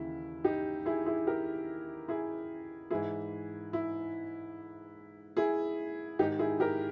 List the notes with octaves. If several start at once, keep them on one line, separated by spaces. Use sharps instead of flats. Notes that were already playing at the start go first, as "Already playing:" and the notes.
Already playing: D#2 C#3 E3 E4
D#4 G4
E4 G#4
E4 G#4
G4 A#4
E4 G#4
G#2 E3 E4 G#4
E4
E4 G#4
G#2 D#3 D#4 G4
E4 G#4
G4 A#4